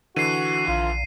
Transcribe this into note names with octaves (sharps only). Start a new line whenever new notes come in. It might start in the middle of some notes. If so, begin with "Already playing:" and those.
D3 E3 F#4 C7 D#7
A#1 F4